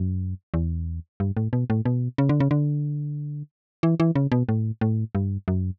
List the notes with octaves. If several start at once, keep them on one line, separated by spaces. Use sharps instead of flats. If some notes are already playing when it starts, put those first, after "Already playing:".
Already playing: F#2
E2
G2
A2
B2
A2
B2
C#3
D3
C#3
D3
E3
E3
C#3
B2
A2
A2
G2
F#2